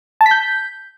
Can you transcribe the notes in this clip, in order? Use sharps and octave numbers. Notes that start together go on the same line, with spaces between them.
A5
B6
G6